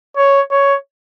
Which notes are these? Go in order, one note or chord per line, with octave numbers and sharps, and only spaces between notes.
C#5
C#5